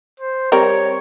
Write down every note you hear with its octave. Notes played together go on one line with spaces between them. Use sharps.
C5
G3 C4 A#4 C#5